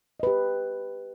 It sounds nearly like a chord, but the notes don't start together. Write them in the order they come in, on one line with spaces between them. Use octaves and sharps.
D#5 B4 G4